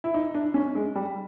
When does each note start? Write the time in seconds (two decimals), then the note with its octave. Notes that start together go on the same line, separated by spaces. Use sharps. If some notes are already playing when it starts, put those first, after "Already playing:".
0.04 E4
0.14 D#4
0.34 D4
0.54 C#4
0.75 G#3
0.95 G3